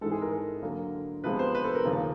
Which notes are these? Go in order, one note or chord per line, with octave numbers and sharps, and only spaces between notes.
G#2 E3 G#3 A4
G#4
A#4
A#4
D3 F#3 A#3
C3 F3 G#3 B3 B4
C5
B4
A4
A#4
D#2 C#3 F3 A#3